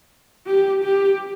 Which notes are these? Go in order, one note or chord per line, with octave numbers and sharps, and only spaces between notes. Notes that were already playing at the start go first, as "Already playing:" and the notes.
G4
G4